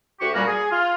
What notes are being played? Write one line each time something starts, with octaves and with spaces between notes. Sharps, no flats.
D2 F#4 G4 C#6
A#2 G3 A#3 C#4 F#4
G#4
F4